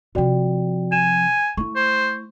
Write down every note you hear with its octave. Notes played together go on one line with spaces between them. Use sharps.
C3 F3 F#4 D5 G5
G#5 E7
A3 E4 C#6
C5